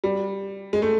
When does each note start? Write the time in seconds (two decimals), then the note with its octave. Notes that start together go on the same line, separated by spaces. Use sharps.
0.04 G3
0.73 G#3
0.82 A3